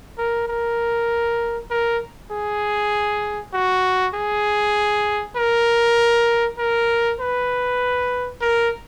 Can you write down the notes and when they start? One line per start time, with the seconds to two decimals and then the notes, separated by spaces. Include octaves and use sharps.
0.18 A#4
0.48 A#4
1.71 A#4
2.32 G#4
3.54 F#4
4.15 G#4
5.37 A#4
6.59 A#4
7.20 B4
8.41 A#4